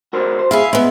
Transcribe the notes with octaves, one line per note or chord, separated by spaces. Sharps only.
F#4 A#4 C5
C5
E4 G#4 E5 F5
G#3 B3